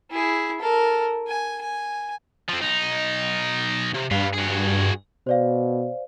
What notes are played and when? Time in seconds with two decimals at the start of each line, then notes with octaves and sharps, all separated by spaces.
0.11 E4 G#4
0.60 A4 A#4
1.28 G#5
1.61 G#5
2.49 F3 C4
2.61 B1 D#4
3.94 C3
4.11 G2 B4 F5
4.33 F#4 G#4
5.27 B2 C5 D5 F5